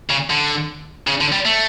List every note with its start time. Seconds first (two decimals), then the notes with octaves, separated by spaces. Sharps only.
0.10 C#3
0.30 D3
1.07 C#3
1.21 D3
1.32 G3
1.45 A3